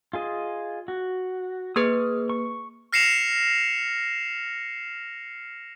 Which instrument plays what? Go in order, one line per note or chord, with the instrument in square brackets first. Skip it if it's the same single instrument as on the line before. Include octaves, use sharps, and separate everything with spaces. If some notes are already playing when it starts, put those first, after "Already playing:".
[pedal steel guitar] F4 G#4 D#5
F#4
[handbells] A#3 G#4 B4 [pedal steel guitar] D#6 F6
[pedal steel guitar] C#6
[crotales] F6 A#6 C7 C#7 E7 F7